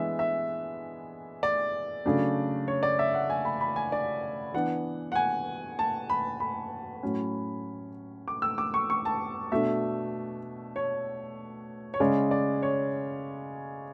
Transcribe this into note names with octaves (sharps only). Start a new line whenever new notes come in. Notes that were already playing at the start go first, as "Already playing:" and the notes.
Already playing: E3 G#3 B3 D4 E5
E5
D5
C#3 F#3 A3 D4
C#5
D5
E5
F#5
G#5
B5
B5
G#5
D5
E3 B3 D4 F#5
F#5
G#5
A5
B5
B5
A2 F#3 C#4
D6
E6
D6
C#6
C#6
A5
B2 A3 D4 E5
C#5
C#5
C#3 G#3 C#4 D5
D5
C#5